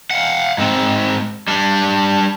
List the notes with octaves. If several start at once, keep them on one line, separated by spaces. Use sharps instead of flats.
F5 F#5
G#2 C4
G3 D4